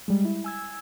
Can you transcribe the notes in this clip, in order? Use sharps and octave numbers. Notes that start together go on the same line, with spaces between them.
G3 G#3
E4
G#5 E6 G#6